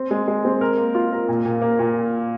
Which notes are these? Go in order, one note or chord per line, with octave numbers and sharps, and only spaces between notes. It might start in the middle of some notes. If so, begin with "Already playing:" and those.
Already playing: C4
G#3
G#3
C4
A#4
A#3
F4
A#4
A#2
A#2
A#3
A#2